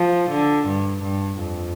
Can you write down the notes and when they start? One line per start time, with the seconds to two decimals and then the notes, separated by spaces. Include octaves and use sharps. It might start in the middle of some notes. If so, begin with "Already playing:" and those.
Already playing: F3
0.30 D3
0.66 G2
1.03 G2
1.39 F2